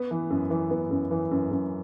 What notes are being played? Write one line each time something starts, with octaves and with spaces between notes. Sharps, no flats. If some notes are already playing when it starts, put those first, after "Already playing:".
Already playing: B3
E3
F#2
E3
B3
F#2
E3
F#2
F#2